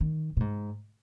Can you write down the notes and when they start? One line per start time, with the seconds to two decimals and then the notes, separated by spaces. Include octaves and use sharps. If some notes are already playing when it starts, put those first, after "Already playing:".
0.01 D#3
0.37 B2
0.40 G#2